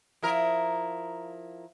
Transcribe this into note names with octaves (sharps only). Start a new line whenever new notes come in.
F3 E4 A#4